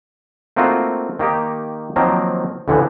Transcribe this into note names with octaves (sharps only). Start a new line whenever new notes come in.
A3 A#3 C4 D#4 F4 F#4
D#3 A#3 D#4 G4
D#3 F3 F#3 A#3 C4
D2 A2 D3 E3 F3